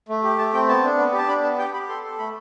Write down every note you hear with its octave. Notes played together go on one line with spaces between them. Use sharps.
A3
G4
A3 A5
C4 G5
B3 A5
D4
B3
G4 A5
D4 B5
B3 A5
G4 G5
G4 B5
A4 C6
A4
A3 B5